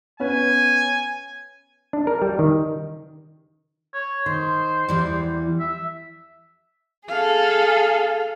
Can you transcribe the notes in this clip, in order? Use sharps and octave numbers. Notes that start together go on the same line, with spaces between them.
B3 C#4 B4 G#5
D4
A#4
G3
D#3
C#5
D#3 C5
E2 E3 G3
E5
G#4 A4 F5